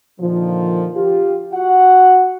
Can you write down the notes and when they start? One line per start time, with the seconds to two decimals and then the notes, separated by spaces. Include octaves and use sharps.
0.20 A#2 D3 D#3 F3
0.96 F4 G4
1.53 F#4 F#5